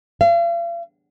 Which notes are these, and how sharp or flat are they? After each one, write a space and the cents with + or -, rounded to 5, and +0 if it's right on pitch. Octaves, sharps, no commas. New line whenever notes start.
F5 -40